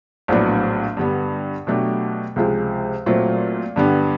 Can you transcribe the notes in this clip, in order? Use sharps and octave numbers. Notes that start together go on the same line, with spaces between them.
A#1 A2 F#3 B3 D4
G2 D3 G3 B3
B2 F#3 A3 D4 G4
C#2 C3 F3 G#3
A#2 F#3 A3 C4 F4
G2 D3 G3 B3